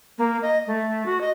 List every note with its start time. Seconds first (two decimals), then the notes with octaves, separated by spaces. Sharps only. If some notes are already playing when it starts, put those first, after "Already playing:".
0.18 A#3
0.42 D#5
0.67 A3
1.06 F#4
1.21 D#5